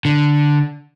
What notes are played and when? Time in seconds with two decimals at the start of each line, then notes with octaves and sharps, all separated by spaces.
0.05 D3